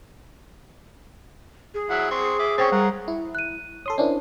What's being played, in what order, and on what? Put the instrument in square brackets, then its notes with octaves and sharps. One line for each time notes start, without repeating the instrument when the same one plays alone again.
[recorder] G#4
[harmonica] F#3 E4 F#5
C4 C6 C#6
E5 D6
[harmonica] C4 C#4 C#5 [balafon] C5 G5 C#6
[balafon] G3 [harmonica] A#4 F#5 A#5
[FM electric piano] E4
[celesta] F#6 D#7
[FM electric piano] A4 C6 D#6 [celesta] C#5
[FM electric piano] C#4 D4 E4 [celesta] A#4 C5 D5